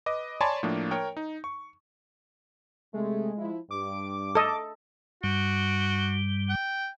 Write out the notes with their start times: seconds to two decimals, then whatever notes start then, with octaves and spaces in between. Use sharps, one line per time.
0.06 B4 D#5 D6
0.41 C#5 D5 G#5 A5 B5 C6
0.63 A2 F3 A#3 D4
0.91 A#4 C#5 G5
1.17 D#4
1.44 C#6
2.94 C3 G#3 A3
3.37 F3 E4
3.71 G2 D6
4.35 A4 D#5
5.23 G2 G3 F#4
6.49 G5